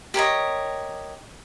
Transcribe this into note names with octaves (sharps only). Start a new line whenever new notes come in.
G4 A#4 C#5 D#5